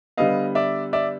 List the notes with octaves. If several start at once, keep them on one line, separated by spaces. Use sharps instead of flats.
D3 G3 B3 D#5 F5
D5 E5
D5 E5